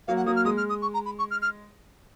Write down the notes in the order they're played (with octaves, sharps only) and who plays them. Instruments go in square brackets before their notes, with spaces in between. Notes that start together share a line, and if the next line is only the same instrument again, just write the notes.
[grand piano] F#3 A#3 [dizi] F5
[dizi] F#5
[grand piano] F#3 A#3 [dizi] D#6
[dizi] F6
[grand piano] G#3 [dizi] D#6
[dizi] F6
D#6
C#6
A#5
B5
C#6
F6
F6